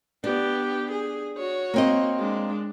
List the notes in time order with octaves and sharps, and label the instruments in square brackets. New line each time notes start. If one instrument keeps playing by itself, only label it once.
[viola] B3 G4 [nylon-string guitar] D4
[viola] G#4
F#4 C#5
[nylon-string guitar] A#3 C4 D#5
[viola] G#3 D4